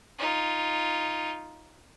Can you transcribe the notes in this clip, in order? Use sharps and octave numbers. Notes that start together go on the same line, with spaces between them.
D#4 F4